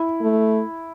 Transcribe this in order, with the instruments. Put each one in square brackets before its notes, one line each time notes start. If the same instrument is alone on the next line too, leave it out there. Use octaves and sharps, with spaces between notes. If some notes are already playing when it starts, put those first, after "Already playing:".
Already playing: [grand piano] E4
[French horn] A3